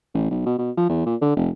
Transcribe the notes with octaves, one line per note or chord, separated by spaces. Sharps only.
A1
B1
B2
B2
F3
E2
A#2
D3
F1